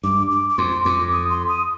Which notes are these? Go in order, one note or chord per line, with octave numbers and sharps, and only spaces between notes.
G2 D6
D6
D6
F2 C6
F2 D6
D#6
C6
D#6